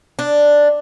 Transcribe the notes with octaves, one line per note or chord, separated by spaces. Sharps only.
D4